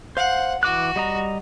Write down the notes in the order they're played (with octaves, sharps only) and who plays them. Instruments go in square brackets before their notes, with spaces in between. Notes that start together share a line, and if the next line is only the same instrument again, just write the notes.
[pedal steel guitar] C5 F5 [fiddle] F#5
[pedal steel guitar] E3 D6 F#6 [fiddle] F#4
[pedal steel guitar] G3 D#5 A#5